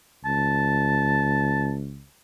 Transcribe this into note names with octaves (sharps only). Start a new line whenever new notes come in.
C#2 A5